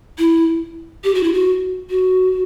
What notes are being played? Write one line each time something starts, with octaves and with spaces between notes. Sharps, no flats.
E4
G4
F#4
E4
F#4
F#4